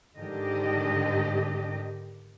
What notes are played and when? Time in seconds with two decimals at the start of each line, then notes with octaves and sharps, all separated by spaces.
0.18 G#2 D3 D#3 D4 G4 D#5